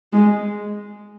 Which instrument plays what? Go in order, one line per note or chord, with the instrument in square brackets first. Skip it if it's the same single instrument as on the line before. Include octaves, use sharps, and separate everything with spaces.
[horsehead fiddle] G#3